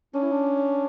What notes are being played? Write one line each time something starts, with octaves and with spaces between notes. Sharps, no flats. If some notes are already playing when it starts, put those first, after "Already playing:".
C#4 D4
E4
D4